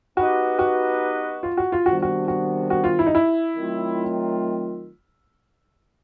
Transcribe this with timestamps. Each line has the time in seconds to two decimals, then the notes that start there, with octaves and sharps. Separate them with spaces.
0.17 B3 D#4 F#4 G4 B4 D#5
0.59 F#4
1.43 F4
1.57 F#4
1.72 F4
1.86 C3 D#3 G3 B3 D4 F#4
2.02 F#4
2.28 F#4
2.70 F#4
2.84 F4
2.99 E4
3.06 D#4
3.15 E4
3.55 D#3 F#3 A3 C4 F4